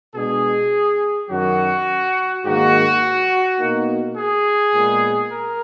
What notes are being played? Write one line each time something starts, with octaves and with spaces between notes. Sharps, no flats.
B2 G#3 D4 G#4
F#2 D#3 F#3 F#4
G#2 D#3 A#3 F#4
B2 A#3 D#4
G#4
A#2 G#3 B3
A#4